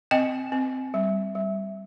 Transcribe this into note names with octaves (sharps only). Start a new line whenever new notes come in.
C4 D#5 G5
C4
G3
G3